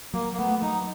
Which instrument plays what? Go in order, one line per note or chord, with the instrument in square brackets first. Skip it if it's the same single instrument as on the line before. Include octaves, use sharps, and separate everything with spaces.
[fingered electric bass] F#3 [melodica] A#3
[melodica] A#3
[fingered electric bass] A3 [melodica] B3
[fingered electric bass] F#3 [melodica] D#4